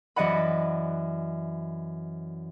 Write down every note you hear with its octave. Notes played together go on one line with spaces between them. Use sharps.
F#2 E3 D5 D#5 F#5 B5